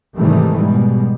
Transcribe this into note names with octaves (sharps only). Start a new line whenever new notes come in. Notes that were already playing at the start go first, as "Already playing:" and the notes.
G#2 C3 D#3 E3 G3 A3
B2 G3 G#3